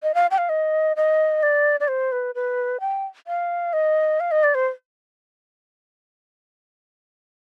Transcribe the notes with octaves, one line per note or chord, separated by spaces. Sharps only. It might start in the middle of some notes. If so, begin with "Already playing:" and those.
D#5
F5
G5
F5
D#5
D#5
D5
D5
C5
B4
B4
G5
F5
D#5
F5
D#5
D5
C5